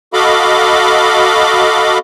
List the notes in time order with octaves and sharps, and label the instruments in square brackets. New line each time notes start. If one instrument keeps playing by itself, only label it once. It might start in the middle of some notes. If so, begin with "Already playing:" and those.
[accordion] F#4 A4 D#5 F5 B5 D6